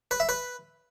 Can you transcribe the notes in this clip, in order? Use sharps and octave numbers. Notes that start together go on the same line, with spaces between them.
B4
E5
B4